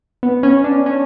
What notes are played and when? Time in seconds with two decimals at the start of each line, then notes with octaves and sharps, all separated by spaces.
0.23 B3
0.43 C#4
0.64 D4
0.86 C#4